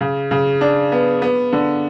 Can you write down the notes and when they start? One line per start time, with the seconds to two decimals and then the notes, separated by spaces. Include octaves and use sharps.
0.01 C#3
0.31 C#3
0.61 D4
0.92 B3
1.22 B3
1.52 D3